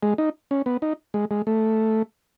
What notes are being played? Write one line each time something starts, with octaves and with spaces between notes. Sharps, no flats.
G#3
D#4
C#4
B3
D#4
G#3
G#3
A3